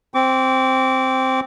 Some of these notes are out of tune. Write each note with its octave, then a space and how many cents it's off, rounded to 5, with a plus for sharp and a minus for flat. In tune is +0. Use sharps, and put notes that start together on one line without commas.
C4 +0 D6 -30